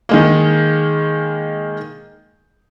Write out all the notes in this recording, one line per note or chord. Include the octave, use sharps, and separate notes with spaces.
D#3 G#3 A#3